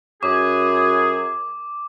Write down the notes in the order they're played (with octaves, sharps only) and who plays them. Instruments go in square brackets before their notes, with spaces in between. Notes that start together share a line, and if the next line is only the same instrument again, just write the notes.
[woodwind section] F#2 G#4 [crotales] D6